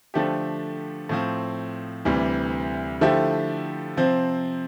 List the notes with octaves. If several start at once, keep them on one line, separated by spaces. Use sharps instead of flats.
D3 F3 A3 D4 G4
A2 F3 C4
D2 C3 E3 G3
D3 F3 A3 E4 G4
C3 F3 C4